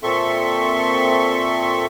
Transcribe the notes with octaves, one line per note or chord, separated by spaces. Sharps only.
A#2 C4 A4 E5 C6 C#6